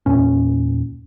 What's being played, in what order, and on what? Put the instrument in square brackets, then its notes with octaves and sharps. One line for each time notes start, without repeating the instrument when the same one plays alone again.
[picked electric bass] E2 A#2 C#4